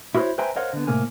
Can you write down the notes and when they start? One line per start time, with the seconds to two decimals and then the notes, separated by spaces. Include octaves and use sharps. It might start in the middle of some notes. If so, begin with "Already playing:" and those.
0.15 E4 F#4 G#4 A#4 C5 C#5
0.38 B4 C5 E5 G5 G#5 A#5
0.56 A#4 C5 C#5 D#5 F5 F#5
0.73 D3 B3
0.87 A2 C3 A#3 A#4 G#5